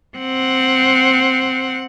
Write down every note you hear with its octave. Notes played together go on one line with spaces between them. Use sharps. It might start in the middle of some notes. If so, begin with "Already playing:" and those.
C4 F#5